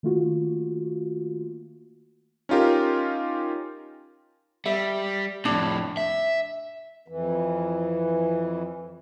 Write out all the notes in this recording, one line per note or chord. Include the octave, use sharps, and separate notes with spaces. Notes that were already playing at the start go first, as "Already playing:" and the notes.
D#3 A3 A#3 F4 F#4
C#4 D#4 F4 G4 A#4
G3 E5
F2 A2 D4
E5
F2 E3